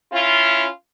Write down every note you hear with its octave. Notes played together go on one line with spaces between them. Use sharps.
C#4 E4 F4